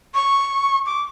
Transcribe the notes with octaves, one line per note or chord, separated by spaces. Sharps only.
C#6
D6